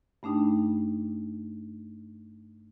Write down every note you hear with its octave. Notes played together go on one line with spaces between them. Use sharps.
G2 A3 D4 D#4 G5